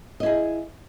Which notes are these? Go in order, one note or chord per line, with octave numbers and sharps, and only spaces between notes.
E4 G#4 D#5